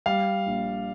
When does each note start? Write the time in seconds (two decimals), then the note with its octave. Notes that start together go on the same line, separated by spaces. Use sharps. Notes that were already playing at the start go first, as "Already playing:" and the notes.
0.06 G3 F5
0.46 A#1